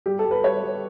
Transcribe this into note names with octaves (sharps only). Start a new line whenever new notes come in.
G3 G4
A4
G3
B4
G3 C#5
G3